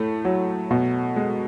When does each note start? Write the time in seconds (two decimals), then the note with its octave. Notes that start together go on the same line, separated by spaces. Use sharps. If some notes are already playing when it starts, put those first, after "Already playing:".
Already playing: A2 A3
0.25 F#3
0.71 B2
1.16 G#3